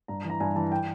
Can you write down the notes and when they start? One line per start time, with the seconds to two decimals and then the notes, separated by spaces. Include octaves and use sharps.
0.08 G2 A#5
0.24 E3
0.30 A#5
0.40 G2 G#5
0.56 E3 A5
0.72 G5